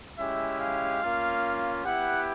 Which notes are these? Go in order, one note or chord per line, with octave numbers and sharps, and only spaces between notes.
G#3 C#4 E4 G4 E5
F5
A#3 C#4 F4
B3 E4 G4 F#5